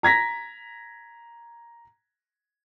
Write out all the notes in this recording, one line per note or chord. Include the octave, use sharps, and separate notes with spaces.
A#5 G#6 A#6 B6